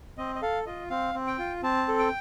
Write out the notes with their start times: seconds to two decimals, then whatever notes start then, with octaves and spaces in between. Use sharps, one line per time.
0.18 C4 D#5
0.35 D#5
0.42 A4 F5
0.66 F4 D#5
0.90 C4 F5
1.15 C4
1.27 G5
1.39 F4
1.63 C4 A5
1.88 A4
1.99 G5